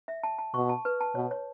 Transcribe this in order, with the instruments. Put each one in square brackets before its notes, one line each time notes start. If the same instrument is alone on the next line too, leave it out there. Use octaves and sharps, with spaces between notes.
[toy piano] E5
A5
A5
[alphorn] B2 [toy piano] C#6
[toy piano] A5
B4
A5
[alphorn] B2 [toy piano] C#5
[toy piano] C#5